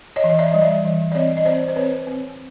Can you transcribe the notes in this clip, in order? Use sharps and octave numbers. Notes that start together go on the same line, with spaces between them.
C#5 D#5
E3
D#5
D5 E5
G3 D#5
D5 E5
E3
D5
C4 C#5 D#5
D#5
C4 C5 D5
C5
C4 B4 C#5
C4